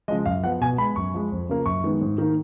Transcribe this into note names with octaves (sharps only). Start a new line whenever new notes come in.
C#3 F3 G#3 D#5
F#2 F5
F3 B3 F#5
B2 G#5
G#3 B3 B5
F#2 C#6
F3 G#3
F2
C#3 F3 A#3
F#2 C#6
D#3 G#3 B3
G#2
D#3 A#3